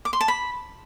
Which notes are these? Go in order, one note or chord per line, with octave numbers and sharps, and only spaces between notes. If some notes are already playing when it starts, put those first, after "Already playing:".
D6
C6
A5
B5